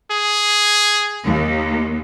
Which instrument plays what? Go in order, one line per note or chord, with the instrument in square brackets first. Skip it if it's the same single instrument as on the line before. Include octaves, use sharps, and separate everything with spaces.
[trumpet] G#4
[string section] D#2